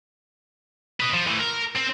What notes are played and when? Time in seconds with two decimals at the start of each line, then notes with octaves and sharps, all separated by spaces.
1.00 B4 D#5
1.13 F3
1.27 E3 A3
1.39 A#4
1.76 C4